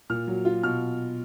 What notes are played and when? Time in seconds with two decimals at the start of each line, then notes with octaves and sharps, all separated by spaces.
0.10 A#2 F6
0.27 F#3
0.45 F4
0.63 B2 F6